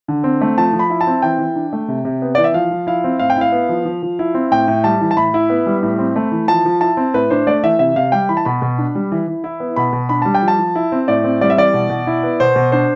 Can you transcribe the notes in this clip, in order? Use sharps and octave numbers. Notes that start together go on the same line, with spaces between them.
D3
C4
A3
F3 A5
F3
B5
E4
A5
C4
E3 G5
E3
D4
A3
C3
C3
B3
E3 D5
E5
F3 F5
F3
E4 F5
C4
A2 F5
G5
E4
F5
B3
F3
F3
F3
E4
C4
A2 G5
A2
G3 A5
E3
A5
A2 B5
E4
B3
G3
A2
C4
A3
E3
F3 A5
F3
E4 A5
C4
A2 B4
D4 C5
A3 D5
E3 E5
C3 E5
C3 F5
G3 G5
E3 B5
A5
B2 B5
B2
D4
G3
E3
E3
E4
B3
B2 B5
B2
D4 B5
G3 A5
G5
F3
A5
F3
E4
C4
A2 D5
C4
G3 D5
E5
E3 D5
B2
B2
E4
B3
B2 C5
B2
D4 C5